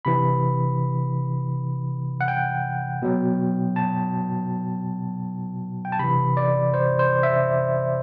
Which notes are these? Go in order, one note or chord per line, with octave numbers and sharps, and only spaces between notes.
C3 E3 B5
F#5
G5
B2 F#3
A5
G5
A5
C3 E3 B5
D5
C5
C5
E5